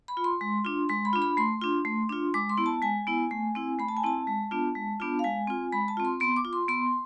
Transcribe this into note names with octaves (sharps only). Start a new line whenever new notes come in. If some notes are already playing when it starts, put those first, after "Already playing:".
B5
F4
C6
G#3
D4 F4
G#3 C6
B5
D4 F4
B5
A3 C6
D4 F4
A3
D4 F4
G#3 D6
C6
B3 E4
A5
G#3 G#5
B3 E4
A3
C4 E4
A3 B5
A5
G#5
C4 E4 A5
G#3
B3 D4 F4
G#3
B3 D4 F4
F5
G#3 G#5
C4 F4
G#3 B5
A5
C4 F4
C6
B3 C6
D6
F4
C6
B3 C6